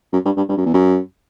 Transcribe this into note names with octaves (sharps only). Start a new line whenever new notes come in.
F#2
G2
G2
G2
F#2
E2
F#2